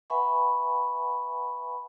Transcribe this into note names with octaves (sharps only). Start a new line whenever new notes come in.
B4 E5 F#5 G#5 B5 C#6